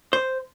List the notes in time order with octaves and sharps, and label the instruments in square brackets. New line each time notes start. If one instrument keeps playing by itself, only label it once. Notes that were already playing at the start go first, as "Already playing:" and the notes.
[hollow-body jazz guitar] C5